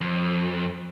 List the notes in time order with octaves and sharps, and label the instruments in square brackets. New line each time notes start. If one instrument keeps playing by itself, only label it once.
[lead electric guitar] F2